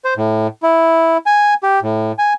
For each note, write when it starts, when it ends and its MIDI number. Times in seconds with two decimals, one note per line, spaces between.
0.05 0.14 72
0.17 0.47 45
0.63 1.17 64
1.26 1.54 80
1.63 1.79 67
1.83 2.12 45
2.19 2.33 80